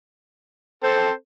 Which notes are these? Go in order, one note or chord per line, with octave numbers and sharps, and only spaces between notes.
C4 A4 C5